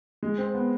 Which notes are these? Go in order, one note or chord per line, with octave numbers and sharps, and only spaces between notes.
G#3
C4
B3